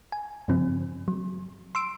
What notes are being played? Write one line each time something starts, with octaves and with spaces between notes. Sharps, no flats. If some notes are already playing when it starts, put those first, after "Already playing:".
G#5
G2 C#3 F3 C4
F#3
C6 E6 D7